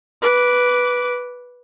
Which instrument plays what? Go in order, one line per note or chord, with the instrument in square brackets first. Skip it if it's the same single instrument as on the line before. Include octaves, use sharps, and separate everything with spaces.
[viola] B4 D6